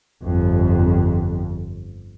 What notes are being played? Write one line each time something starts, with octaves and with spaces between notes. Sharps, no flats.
G1 F2